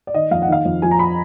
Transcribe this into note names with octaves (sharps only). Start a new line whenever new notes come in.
D5
D#3 D#5
F2 F5
F#5
D#3 F5
F2
F3 G#5
A#5
B5